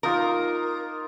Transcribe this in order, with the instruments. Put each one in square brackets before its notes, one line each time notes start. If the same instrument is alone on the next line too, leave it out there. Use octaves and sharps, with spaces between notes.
[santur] A#3 D#4 F4 [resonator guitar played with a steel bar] A#4